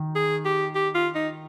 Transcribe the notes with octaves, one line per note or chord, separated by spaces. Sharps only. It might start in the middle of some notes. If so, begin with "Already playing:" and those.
Already playing: D#3
G#4
G4
G4
F4
D#4